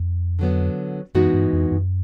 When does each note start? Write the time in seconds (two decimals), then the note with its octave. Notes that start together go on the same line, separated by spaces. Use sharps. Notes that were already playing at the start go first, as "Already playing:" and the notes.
Already playing: F2
0.39 D3 F#3 B3
1.15 F#2 E3 G#3 B3 D#4 F#4
1.34 G2
1.53 F2
1.72 F#2